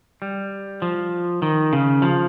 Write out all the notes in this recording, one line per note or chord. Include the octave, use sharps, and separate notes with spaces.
G3
F3
D#3
C#3
F3